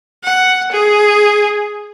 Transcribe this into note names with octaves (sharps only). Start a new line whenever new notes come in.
F#5
G#4